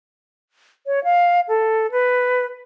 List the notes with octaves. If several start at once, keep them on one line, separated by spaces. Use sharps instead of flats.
C#5
F5
A4
B4